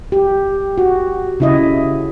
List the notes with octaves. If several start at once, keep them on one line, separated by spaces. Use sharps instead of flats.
G4
F#4
C#3 E4 D#5